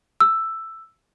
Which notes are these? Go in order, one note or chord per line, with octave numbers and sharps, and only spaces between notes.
E6